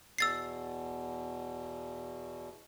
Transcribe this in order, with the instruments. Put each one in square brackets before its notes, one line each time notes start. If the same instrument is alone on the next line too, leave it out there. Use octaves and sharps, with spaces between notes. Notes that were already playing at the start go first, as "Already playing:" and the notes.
[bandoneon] E2 B2 [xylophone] E6 A6 C7